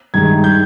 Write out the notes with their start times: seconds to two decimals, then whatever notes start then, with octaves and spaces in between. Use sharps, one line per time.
0.14 G2 D#3 G#3 D#4 G#6
0.44 G6